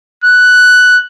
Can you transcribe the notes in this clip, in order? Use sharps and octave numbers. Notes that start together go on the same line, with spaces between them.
F#6